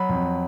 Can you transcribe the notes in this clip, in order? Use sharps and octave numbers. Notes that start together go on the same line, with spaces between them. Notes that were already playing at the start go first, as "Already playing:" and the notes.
Already playing: F#3 B5
F2